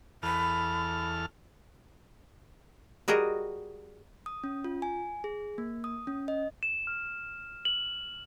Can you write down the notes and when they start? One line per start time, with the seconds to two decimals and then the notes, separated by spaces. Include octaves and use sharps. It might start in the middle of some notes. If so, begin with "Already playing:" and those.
0.23 E2 A4 B5 F6
3.08 G3 F#4 G#4 A#4 D#5
4.26 D#6
4.44 C#4
4.64 F4
4.82 G#5
5.24 G#4
5.58 A#3
5.84 D#6
6.07 C#4
6.28 D#5
6.63 E7
6.87 F6
7.65 F#7